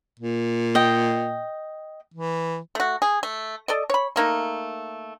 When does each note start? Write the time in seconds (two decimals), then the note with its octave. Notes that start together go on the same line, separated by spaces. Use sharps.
0.20 A#2
0.75 D#5 G5
2.14 E3
2.75 A3 F#4
3.02 G#4
3.23 A3
3.68 A4 D5 D#5
3.90 C#5 B5
4.16 A3 A#3 D#4